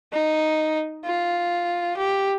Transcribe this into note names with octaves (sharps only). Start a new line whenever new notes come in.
D#4
F4
G4